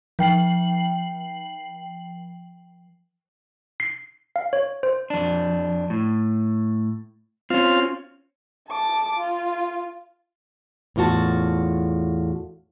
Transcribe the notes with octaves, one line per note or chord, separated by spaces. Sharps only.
F3 G5 C7 F#7
C7
F5
C#5
C5
F2 D4
A2
C4 C#4 F4
A5 D6
F4
E2 A2 F4 F#4 A5